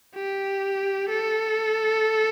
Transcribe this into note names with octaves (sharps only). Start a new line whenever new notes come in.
G4
A4